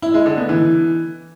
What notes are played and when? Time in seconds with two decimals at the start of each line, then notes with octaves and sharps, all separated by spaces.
0.02 E4
0.14 G#3
0.26 D3
0.37 B3
0.49 E3